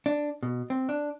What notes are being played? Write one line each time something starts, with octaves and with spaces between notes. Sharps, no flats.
D4
B2
C4
D4